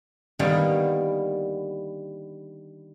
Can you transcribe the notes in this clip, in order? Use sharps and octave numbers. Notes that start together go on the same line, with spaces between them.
D3 D#3 G3 A#3 B3